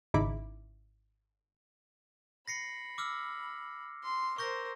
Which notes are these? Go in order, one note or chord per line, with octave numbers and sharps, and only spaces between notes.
G#1 C#3 D#4 E4 B5 D6
B5 A#6 C7 C#7
D6 E6 F6
C6
A#4 C5 C#6 G6 A#6